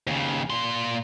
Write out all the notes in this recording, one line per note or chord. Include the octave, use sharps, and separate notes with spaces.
D#2 C#3
A#2 C6